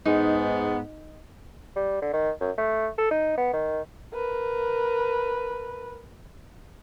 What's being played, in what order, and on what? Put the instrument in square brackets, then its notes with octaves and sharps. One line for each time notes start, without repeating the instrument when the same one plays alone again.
[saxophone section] G#2 G#3 B3 [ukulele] D#4
[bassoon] G3
D3
D#3
F#2
A3
A4
D#4
B3
D#3
[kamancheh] A#4 B4